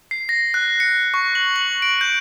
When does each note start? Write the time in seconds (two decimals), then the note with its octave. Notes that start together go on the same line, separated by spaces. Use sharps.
0.11 C7
0.29 A#6
0.54 F#6
0.80 C#7
1.14 C#6
1.35 F#7
1.56 F#7
1.82 D7
2.01 G6